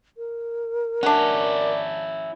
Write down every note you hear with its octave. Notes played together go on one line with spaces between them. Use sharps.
A#4
C#4 D4 E4 F#4 D5